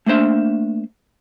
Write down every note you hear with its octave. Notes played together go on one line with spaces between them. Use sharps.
A3 A#3 D4 C5 E5